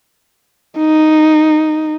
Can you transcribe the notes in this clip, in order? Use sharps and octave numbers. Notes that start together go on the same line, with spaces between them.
D#4